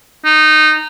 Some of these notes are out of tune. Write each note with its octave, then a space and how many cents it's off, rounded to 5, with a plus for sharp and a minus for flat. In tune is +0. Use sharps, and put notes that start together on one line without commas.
D#4 -15